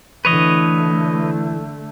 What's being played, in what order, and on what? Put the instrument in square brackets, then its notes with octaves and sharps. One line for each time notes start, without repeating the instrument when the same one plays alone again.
[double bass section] D3 A3 [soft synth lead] E3 [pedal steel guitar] B4 C#5 D#5